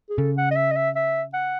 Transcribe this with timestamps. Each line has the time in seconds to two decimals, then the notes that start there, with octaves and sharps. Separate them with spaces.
0.09 G#4
0.17 C#3 A4
0.37 F#5
0.51 D#5
0.56 E5
0.71 D#5
0.76 E5
0.95 E5
1.33 F#5